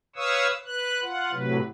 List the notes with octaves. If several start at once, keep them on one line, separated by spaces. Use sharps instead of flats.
B4 C#5 F5 C#6 D#6 E6
B4 F#6
F4 F#5
A2 C3 F#3 B4